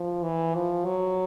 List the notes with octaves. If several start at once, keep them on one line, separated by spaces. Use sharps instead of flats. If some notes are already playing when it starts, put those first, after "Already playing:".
Already playing: F3
E3
F3
F#3